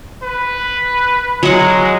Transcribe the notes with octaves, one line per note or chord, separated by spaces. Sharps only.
B4
F#3 G#3 F#5